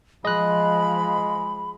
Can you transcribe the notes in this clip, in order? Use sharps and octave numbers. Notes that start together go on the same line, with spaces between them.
F3 G#3 D#5 B5 F#6